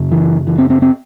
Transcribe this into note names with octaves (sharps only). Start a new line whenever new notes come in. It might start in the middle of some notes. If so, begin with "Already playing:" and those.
Already playing: F#2 C#3
E3
E3
C4
C4
C4